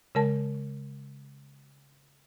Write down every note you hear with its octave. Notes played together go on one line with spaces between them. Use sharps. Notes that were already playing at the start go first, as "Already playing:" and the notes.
C#3 G#3 A#4 A5